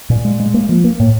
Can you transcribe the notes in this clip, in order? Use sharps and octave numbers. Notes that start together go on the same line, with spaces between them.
A#2
G#3
G#3
A#3
F3
A#3
A2